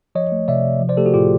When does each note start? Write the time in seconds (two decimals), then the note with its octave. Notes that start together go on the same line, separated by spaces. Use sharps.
0.15 F3 C#5 D#5
0.32 A3
0.48 C3 D5 E5
0.64 C3
0.81 F3
0.89 C5 D5
0.97 A3 G4 A4
1.06 F#4 G#4
1.14 A2 F4 G4